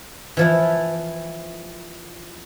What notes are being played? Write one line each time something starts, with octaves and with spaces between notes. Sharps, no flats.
E3 F3 E4